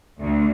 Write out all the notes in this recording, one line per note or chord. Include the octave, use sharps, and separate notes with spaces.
D2